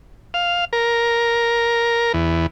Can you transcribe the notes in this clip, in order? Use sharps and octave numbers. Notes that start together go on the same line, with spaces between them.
F5
A#4
E2